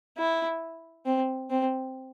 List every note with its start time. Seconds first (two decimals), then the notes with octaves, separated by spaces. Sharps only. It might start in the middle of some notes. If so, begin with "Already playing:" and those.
0.18 E4
1.06 C4
1.50 C4